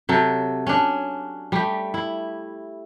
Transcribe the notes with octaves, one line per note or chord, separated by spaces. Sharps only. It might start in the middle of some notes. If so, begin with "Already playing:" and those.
C3 F#3 A4
C#4 D4
G3 A3 G4
E4